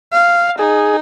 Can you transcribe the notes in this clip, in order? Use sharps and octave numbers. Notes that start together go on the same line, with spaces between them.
F5
D#4 G#4